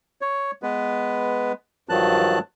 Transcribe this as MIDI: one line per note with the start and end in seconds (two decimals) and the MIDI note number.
0.21 0.51 73
0.63 1.52 56
0.63 1.52 59
0.63 1.52 71
1.89 2.39 43
1.89 2.39 51
1.89 2.39 53
1.89 2.39 54
1.89 2.39 81
1.89 2.39 90